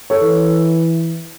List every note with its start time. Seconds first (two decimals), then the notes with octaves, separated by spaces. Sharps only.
0.10 A4 C#5
0.22 E3